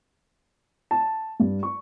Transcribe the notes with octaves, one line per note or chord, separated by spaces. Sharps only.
A5
G2
C#6